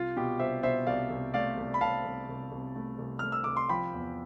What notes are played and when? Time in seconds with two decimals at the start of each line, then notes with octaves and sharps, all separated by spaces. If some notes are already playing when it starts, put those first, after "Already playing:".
Already playing: C2 F4
0.17 B2 G4
0.39 C2 C5 E5
0.63 B2 C5 E5
0.87 C2 D5 F5
1.10 C2
1.34 A3 D5 F5
1.57 C2
1.74 B5
1.81 C2 F5 A5
2.05 C2
2.29 C2
2.52 C2
2.76 A3
2.99 C2
3.19 A3 F6
3.32 E6
3.44 C2 D6
3.57 C6
3.69 F3 G5 B5
3.93 E2